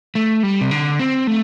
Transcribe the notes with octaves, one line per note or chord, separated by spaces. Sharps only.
A3
G3
C3
D3
C4
A3